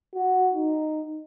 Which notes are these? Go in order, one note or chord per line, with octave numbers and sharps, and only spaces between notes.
F#4
D#4